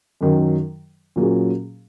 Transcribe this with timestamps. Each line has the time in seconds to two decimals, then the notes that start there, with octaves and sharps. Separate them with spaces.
0.21 F#2 D#3 F#3
1.16 A#2 F#3 C#4 G#4